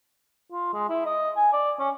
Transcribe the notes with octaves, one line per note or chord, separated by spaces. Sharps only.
F4
G#3
E4
D#5
G#5
D5
C#4